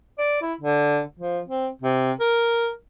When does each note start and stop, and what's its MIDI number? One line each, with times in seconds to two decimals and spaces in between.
0.18 0.40 74
0.41 0.54 64
0.61 1.01 50
1.19 1.40 53
1.48 1.69 60
1.82 2.12 48
2.20 2.70 70